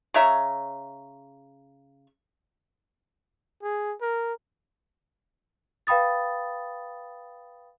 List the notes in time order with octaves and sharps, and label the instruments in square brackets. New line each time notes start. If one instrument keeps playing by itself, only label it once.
[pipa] C#3 C#5 E5 A#5
[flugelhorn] G#4
A#4
[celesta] B4 F5 G5 B5 D#6 A6